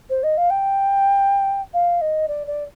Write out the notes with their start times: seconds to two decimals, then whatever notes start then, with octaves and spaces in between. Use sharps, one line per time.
0.10 C5
0.23 D#5
0.37 F5
0.50 G5
1.74 F5
2.01 D#5
2.28 D5
2.47 D5